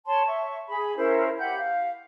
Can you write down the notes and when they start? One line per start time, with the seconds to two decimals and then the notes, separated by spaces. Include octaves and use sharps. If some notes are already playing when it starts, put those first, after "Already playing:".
0.06 C#5 A5 C6
0.26 E5 C#6
0.69 G#4 B5
0.97 C#4 E4 A#4 C5
1.38 G4 F#5 B5 G6
1.58 F5